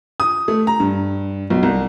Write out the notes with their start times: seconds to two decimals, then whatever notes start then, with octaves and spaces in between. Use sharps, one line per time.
0.20 D#6
0.48 A3
0.67 A#5
0.80 G2
1.50 B1
1.63 C2